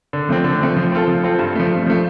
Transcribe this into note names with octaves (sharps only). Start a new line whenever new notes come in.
D3
F3 A3 C4
D3
F3 A3 C4
F3
C4 F4 A4
F3
C4 F4 A4
G2
F3 A3
G2
F3 A3